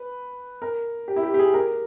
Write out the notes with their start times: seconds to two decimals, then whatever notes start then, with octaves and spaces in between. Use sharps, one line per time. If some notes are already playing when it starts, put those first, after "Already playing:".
Already playing: B4
0.62 A#4
1.08 G4
1.16 E4
1.23 G4
1.34 G4
1.39 G#4
1.54 A#4